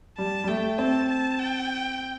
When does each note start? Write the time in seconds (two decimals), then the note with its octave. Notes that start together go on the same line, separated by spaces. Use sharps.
0.18 G3 A5
0.44 G3
0.48 A3 G5
0.78 C4 A5
1.09 A5
1.39 G5